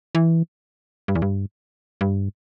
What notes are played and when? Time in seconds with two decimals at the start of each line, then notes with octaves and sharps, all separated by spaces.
0.15 E3
1.08 G2
1.15 E2
1.22 G2
2.01 G2